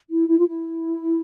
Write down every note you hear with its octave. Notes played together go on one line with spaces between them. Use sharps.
E4
E4
F4
E4